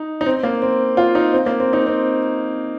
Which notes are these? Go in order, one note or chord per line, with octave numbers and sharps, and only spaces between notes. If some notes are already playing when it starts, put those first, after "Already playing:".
Already playing: D#4
D#4
C4
A#3
C4
F4
D#4
C4
A#3
C4
D#4
C4